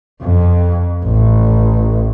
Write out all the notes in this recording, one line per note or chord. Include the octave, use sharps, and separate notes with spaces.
F2
A1